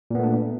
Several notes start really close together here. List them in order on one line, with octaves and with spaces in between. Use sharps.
A#2 B3 A3 D4